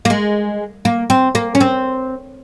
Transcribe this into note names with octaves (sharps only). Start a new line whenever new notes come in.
A#3
G#3
A#3
C4
A#3
C#4
C4